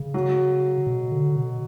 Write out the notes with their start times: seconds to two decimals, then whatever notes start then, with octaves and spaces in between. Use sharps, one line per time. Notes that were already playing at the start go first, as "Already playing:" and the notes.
Already playing: C#3
0.14 F#3
0.87 B2
1.12 D3
1.36 B2